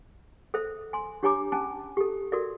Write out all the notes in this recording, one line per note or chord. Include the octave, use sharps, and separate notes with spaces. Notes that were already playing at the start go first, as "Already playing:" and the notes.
A4 C5 E5
G#5 C6
D4 G4 C#5 G#5 A#5 D6
C#4 G#5 A5
G4 A4
F#4 A4 A#4 D5 E5